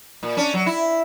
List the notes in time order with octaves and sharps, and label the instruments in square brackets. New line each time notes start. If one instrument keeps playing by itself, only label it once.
[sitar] A#2
C#4 D4
F#3
E4